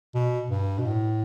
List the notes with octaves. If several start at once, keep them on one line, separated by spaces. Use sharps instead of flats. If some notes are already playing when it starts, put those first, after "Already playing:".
B2
G2
B2
A2